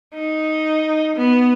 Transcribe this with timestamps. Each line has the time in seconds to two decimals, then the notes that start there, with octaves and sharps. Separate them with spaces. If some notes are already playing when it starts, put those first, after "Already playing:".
0.14 D#4
1.16 B3